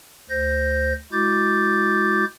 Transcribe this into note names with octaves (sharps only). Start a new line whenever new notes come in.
D2 C5 G6 A#6
G#3 E4 F#4 D6 G6 A6